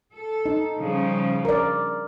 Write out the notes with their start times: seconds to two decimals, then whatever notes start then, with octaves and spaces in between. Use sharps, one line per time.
0.13 A4
0.46 D#4
0.77 C#3 F3 G3
1.45 A#4 D5